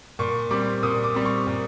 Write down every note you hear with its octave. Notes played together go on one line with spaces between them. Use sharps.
A#2 C#6
G3 C4 D6
A#2 D#6
D6
G3 C4
C#6
A#2